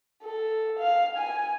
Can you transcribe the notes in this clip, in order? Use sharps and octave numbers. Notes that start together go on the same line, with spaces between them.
A4
F5
G#5